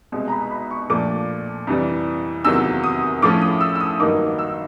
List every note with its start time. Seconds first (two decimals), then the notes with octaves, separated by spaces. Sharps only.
0.12 C2 B2 G#3
0.28 A#5
0.32 B5
0.51 B5
0.71 C#6
0.90 A#2 F3 A3 D4 D6
1.67 F2 C3 E3 G3
2.45 E2 C3 D#3 F#3 A#3 E6
2.84 D#6
3.22 A2 F3 A3 C#4 D6
3.42 D#6
3.61 E6
3.75 E6
3.80 D#6
4.00 G2 D#3 F#3 A#3 D#4 D6
4.39 E6